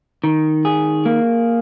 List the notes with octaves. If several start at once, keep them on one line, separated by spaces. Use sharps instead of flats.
D#3
G#4
A#3